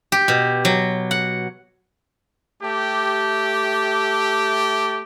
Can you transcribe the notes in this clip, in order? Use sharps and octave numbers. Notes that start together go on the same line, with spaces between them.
G4
B2
F#3
F#5
A3 G4